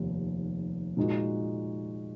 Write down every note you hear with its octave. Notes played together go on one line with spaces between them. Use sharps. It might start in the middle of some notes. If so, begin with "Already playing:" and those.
Already playing: F1 D#2 D#3
A#2 G#3 D#4 F#4